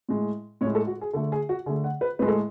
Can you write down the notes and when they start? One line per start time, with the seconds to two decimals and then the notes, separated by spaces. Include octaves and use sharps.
0.09 A2 G#3
0.61 A2 C#5
0.66 G#3
0.75 A4
0.87 F#4
1.01 G#4
1.13 D3 A3 A4
1.32 G#4
1.49 F#4
1.66 D3 G#4
1.69 A3
1.84 F#5
2.01 B4
2.19 A2 G#3 B4
2.28 A4